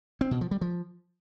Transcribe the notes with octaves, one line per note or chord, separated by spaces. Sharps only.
C4
B2
F3
G3
F3